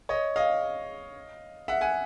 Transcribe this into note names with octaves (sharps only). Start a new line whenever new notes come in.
C#5 D#5
D#5 F5
E5 F#5
F#5 G#5